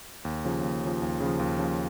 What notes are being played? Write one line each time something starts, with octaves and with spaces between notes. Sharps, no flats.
D#2
C#3 F3
D#2
C#3 F3
D#2
C#3
F3
D#2
C#3 F3